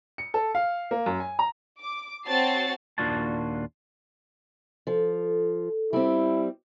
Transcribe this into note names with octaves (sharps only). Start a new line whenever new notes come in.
C#7
A4
F5
A#3
F#2
G#5
A#5
D6
C4 F#4 C#5 A5 A6 C7
D#2 A#2 D4 F4 F#4 A5
F3 A4
G3 C4 E4